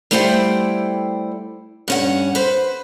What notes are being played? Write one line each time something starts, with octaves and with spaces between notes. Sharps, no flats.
G3 A3 E4 C5 F#5 G5
G2 C#4 F#5
B4 C5